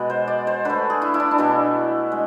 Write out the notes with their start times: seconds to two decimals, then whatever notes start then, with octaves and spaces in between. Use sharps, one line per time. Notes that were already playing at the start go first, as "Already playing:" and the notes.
Already playing: B2 G#3 D5
0.10 C5
0.28 D5
0.47 C5
0.65 D3 A3 B4
0.90 G#4
1.02 E4
1.14 E4
1.20 D4
1.31 D4
1.38 B2 A3 E4
2.12 G#3